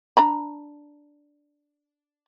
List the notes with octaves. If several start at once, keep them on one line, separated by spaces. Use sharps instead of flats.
D4 A#5 B5